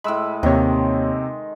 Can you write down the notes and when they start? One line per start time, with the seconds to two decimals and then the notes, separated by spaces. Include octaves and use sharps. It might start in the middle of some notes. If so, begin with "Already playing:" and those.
0.04 A2 G#3 B5 E6
0.43 D#2 C3 D#3 A#3 C4 C#5